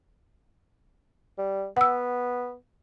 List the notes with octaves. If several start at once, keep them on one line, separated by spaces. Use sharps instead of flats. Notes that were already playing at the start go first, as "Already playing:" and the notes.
G3
B3 F#5 E6